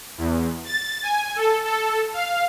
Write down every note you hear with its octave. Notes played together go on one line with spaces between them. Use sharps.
E2
A6
G#5
A4
A4
F5